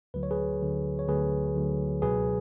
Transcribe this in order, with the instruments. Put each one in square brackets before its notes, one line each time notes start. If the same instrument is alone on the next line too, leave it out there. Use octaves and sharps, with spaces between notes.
[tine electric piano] D2 D3 F#3 B4
C#5
G#4 B4
D2 D3 F#3
C#5
D2 D3 F#3 G#4 B4
D2 D3 F#3
C#2 B2 F#3 G#4 B4